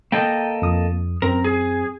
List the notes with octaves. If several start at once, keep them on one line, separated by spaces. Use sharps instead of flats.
A#3 A4 D#5 G5
F2 D#6
F#2 C4 A#4
G#4